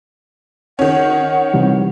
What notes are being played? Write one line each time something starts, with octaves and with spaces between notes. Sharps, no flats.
D#3 C#4 F#5
C3 E3 G3